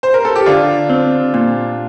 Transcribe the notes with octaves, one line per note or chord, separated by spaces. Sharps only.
C5
A#4
A4
G4
D3 D4 F4
C4
A#2